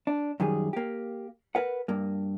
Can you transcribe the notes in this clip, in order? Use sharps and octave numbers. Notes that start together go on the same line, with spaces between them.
D4
F#2 D#3 G3 G#4
A#3 G4
A#4 B4 F#5
G2 A#3